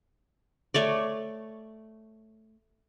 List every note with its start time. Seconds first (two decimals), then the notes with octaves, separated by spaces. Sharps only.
0.74 A3 C#5 D5